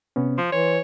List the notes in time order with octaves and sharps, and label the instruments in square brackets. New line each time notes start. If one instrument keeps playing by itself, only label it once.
[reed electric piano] C3 B3 C#4
[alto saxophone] F3 [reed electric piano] C6
[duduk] E3 [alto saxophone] C#5